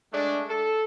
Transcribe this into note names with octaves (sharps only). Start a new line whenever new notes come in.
G#3 A3 D4
A4